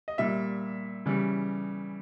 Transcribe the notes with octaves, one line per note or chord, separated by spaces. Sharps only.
D#5
A#2 G3 E5
C#3 E3 G3